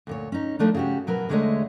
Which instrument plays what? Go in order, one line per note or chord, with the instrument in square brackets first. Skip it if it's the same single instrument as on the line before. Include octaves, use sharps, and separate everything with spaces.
[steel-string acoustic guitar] D2 A#2 C#5
C#4 D#4
D#2 A#2 F3 A3 D4 D#4
C#3 F#4 G4
B2 F#3 A#4 B4
E2 D3 G#3 A3 C#5 D#5